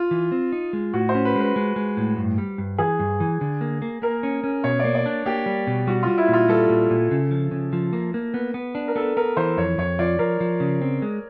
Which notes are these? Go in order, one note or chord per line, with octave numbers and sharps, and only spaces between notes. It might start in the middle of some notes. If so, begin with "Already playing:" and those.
Already playing: F4
E3
C4
D#4
G#3
A2 F#4
C5
C#4
B4
G#3 B4
G#3
G#3
A2
G2
G3
G2
E3 G#4
G2
E3
D3
A#3
A#3
A#3 A#4
C#4
C#4
B2 C#5
A#3 D5
D5
D4
A#3 G4
G3
B2
G3 F#4
G3 F4
E4
A#2
F4
G3 A4
A#2
A#2
C#3
F3
C#3
F3
A#3
A#3
B3
B3
D4
A#4
B3 A4
B3 A#4
E3 C5
F2 C#5
F2 C#5
F3 D5
F3 A#4
F3
C#3
C4
G#3